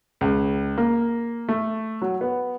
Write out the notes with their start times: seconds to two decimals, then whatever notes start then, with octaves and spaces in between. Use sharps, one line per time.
0.21 C#2
0.78 A#3
1.49 A3
2.02 F#3
2.21 B3